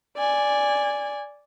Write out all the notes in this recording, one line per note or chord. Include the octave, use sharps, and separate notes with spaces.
D5 G#5